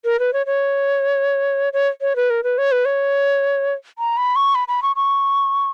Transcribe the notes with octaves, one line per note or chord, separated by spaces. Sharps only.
A#4
B4
C#5
C#5
C#5
C#5
B4
A#4
B4
C#5
B4
C#5
A#5
B5
C#6
B5
B5
C#6
C#6